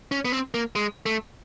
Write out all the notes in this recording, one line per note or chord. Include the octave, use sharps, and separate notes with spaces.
C#4
B3
C4
A#3
G#3
A3